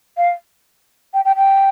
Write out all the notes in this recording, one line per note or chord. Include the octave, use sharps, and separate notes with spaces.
F5
G5
G5
G5